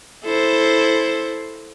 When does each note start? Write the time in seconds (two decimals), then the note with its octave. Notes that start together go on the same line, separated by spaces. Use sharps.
0.25 E4 A4 C5